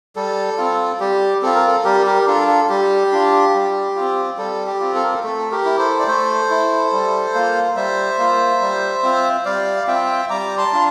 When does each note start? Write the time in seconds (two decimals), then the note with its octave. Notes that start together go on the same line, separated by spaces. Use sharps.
0.16 G3 A4
0.58 C4 F4
1.00 G3 G4
1.42 C4 F4 A4
1.55 A#4
1.68 A4
1.85 G3 G4 A#4
2.06 G4 A#4
2.27 D4 F4 A4
2.48 A4
2.69 G3 G4
3.12 D4 F4
3.54 G3
3.96 C4 F4
4.38 G3 A4
4.67 G4
4.80 C4 F4
4.95 A4
5.03 A#4
5.13 A4
5.23 A3 A4
5.51 G4 A#4
5.65 E4
5.79 A4 C5
5.99 D5
6.08 A3 A4 C5
6.50 E4
6.93 G3
7.34 A#3 F4
7.76 G3 C5 E5
8.19 A#3 F4
8.61 G3
9.03 C4 F4
9.45 G3 D5 F5
9.87 C4 F4 E5 G5
10.30 G3 A#5 D6
10.58 A5 C6
10.73 D4 F4